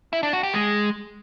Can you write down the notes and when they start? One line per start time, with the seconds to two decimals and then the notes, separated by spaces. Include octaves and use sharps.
0.13 E4
0.23 D4
0.33 F#4
0.43 G4
0.54 G#3